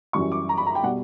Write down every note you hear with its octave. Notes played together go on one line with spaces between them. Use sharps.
F#2 E3 G3 C#6
D6
A#5
B5
A#5
G5
B2 G3 F#5